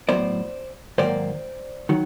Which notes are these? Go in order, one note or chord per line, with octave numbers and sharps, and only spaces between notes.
A2 F#3 B3 C5 D5
G#2 D#3 F#3 A#3 C5 D5
D#3 F#3